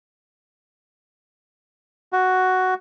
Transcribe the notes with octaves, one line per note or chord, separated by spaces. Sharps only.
F#4